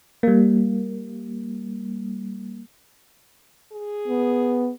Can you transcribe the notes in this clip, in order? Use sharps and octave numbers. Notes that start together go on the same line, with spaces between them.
G3 A#3
G#4
B3